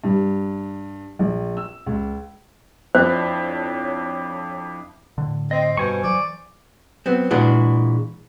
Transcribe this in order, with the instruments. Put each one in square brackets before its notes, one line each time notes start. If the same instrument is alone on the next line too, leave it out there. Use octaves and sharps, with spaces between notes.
[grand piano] G2
A#1
E6
C#2
[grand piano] F2 [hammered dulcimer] D4 E4 [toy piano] C5 [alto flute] C#5
[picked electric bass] A2 D3
[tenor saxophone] C4 [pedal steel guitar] D#5
[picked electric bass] G2 [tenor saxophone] B2 [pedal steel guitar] C5 G#5 C#6
[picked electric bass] E3 F#3 [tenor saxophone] D5
[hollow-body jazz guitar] F#3 B3 C4
A#2 E3 G#3 D4 F#4